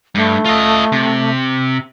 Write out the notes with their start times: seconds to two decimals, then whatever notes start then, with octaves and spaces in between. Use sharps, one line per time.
0.15 G2 A3
0.45 F4 D#5
0.92 C3